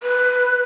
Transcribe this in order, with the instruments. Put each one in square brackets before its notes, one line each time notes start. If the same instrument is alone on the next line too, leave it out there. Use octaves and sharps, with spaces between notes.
[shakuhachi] B4